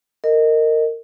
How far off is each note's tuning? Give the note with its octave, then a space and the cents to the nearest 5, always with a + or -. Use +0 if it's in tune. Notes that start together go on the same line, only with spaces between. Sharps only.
A#4 -20 D#5 +0